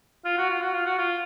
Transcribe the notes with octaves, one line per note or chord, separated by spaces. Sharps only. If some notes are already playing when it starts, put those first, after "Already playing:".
F4
F#4
F4
F#4
F4
F#4
F4